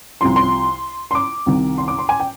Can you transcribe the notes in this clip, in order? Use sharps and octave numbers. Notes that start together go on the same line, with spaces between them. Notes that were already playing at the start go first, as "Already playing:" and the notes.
C2 C3 F3 C6
C6
C6
D6
C2 C3 D#3
C6
D6
C6
G#5
G5